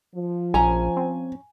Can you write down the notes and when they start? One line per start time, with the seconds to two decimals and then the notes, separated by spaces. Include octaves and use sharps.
0.15 F3
0.54 A#1 C#4 G#5 A#5
0.97 C4